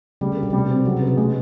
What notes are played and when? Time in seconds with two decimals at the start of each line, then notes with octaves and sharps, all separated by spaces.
0.21 C#3 G3
0.32 D3
0.36 A#3
0.43 B2
0.50 C3 G3
0.58 B2
0.70 C4
0.85 C#3 F#3
0.96 C3
1.01 B3
1.07 C#3
1.17 B2 G#3